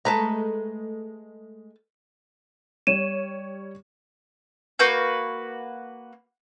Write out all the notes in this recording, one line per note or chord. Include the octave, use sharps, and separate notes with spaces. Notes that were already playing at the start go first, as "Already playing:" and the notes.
G#3 A3 A4 B4 A#5
G3 C#5 D#7 E7
A#3 F#4 B4 G6